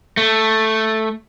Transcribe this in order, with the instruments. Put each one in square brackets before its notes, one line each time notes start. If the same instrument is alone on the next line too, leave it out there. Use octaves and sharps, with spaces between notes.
[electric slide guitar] A3